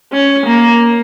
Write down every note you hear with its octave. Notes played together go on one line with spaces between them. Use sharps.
C#4
A#3